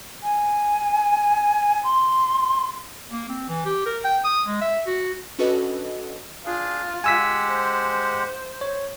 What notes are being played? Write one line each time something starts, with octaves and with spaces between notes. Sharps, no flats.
G#5
C6
A#3
C4
E3
G4
A#4
G5
D#6
G#3
E5
F#4
C#4 D4 F#4 A4 B4 D#5
D4 F4 G#4
G#3 G4 F#5 G#5 E6 B6
C5
C#5